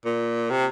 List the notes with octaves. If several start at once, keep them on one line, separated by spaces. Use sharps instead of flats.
A#2
C3